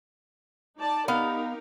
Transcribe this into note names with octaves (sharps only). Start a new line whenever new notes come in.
D#4 D5 A5
B3 D#4 G4 A#4 F5